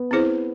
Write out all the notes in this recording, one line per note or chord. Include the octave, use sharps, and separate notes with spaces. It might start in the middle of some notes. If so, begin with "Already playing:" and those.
Already playing: B3
C4 E4 G#4 C5